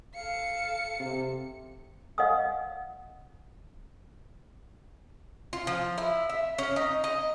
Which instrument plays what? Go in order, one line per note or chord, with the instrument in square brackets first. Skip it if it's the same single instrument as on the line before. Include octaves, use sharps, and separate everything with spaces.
[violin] A4 C#7 [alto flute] F5
[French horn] C3
[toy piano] D#5 F5 F#5 G#5 D#6
[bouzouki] F4
F3
E4
E5
C#4
D#4
D#5